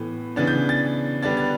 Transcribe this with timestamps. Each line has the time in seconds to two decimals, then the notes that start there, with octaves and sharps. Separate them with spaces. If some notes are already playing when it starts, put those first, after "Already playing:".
Already playing: A2 E3 B3
0.36 C#3 E3 B3 D4 A6
0.47 G6
0.69 A6
1.22 D3 G3 B3 D4 A6
1.37 A6